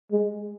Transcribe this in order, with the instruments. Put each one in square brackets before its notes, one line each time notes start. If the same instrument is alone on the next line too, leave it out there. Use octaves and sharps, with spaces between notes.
[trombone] G#3